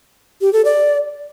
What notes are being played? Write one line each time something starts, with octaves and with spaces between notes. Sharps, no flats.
G4
A4
D5